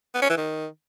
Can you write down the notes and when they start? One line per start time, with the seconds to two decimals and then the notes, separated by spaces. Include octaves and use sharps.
0.14 B3
0.22 C#4
0.30 E3
0.37 D#3